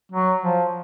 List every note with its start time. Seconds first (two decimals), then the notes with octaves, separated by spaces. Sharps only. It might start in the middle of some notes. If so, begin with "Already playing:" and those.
0.12 F#3
0.42 F3